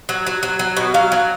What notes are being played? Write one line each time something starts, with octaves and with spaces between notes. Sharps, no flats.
F#3
F#3
F#3
F#3
B2
F#3 F5
F#3